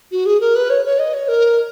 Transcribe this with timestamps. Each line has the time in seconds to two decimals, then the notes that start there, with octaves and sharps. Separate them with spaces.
0.12 F#4
0.26 G#4
0.40 A#4
0.56 B4
0.70 C#5
0.85 C#5
0.99 D#5
1.14 C#5
1.28 A#4